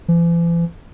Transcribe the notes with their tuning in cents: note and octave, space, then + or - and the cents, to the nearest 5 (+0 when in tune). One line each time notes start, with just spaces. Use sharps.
E3 +45